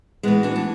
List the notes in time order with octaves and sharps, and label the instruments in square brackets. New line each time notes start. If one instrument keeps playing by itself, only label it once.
[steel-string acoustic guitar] A2 E3 G#3 B3
D4 F#4
D4